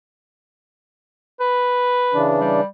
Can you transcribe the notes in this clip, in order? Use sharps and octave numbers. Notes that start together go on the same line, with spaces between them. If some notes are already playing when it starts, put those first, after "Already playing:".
B4
C#3 E3 D4
G3